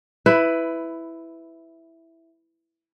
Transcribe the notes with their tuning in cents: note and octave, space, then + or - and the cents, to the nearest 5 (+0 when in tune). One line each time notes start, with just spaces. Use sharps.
E4 +0 B4 +15